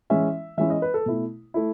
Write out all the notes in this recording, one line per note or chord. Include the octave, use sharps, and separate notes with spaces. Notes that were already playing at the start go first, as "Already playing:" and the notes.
E3 G#3 C#4 E4 E5
E3 G#3 C#4 E4 E5
D#5
B4
A4
B2 A3 E4
A3 E4